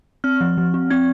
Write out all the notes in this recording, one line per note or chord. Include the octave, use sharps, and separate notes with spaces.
C4 F6
F3
F3
C4
C4 G#6